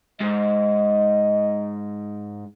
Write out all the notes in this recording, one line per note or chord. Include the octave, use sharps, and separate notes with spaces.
G#2 D#5